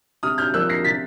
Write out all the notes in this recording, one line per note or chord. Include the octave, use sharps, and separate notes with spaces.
C3 D#6 F6
F6 G6
F3 A#3 E6 F#6
A#6 C7
C3 A6 B6